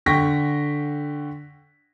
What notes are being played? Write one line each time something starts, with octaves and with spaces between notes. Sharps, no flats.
D3 G5 C#6 A#6 B6